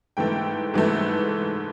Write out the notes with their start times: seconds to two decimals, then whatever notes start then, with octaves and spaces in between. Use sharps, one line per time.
0.17 G#2 E3 A3 G5
0.74 G#2 E3 A3